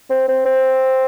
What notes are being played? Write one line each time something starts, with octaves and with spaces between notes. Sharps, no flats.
C4
C4
C4